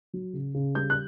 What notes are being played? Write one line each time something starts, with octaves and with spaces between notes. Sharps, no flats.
F#3
C#3
C#3
G3 G6
F#6